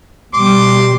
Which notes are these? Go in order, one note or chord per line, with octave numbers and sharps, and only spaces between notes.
B2 G3 C6 D6